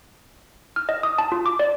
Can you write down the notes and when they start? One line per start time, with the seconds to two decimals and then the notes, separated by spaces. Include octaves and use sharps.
0.76 F6
0.89 D#5
1.03 D#6
1.18 A5
1.32 F4
1.46 D6
1.59 D5